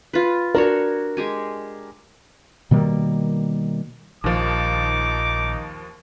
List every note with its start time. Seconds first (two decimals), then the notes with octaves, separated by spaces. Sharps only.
0.13 F4 B4
0.55 D4 F#4 A#4 C#5
1.17 G#3 G4 G#5
2.71 B2 D#3 G3 A#3
4.24 A#1 D#2 F3 D#4 D6